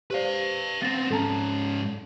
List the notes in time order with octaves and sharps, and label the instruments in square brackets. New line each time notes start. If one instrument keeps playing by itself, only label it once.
[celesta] G4 C5 D5 [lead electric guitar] B4 F5
[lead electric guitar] B3 C4 [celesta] A6 A#6 E7
[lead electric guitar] G#2 C#4 [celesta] A4 A5 A#5